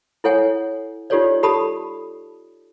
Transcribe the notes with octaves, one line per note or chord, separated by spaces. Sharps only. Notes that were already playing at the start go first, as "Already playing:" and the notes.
E4 A4 C#5 F#5 G#5
D#4 F4 G4 A4 C#5 D5
G4 A4 A5 B5 D#6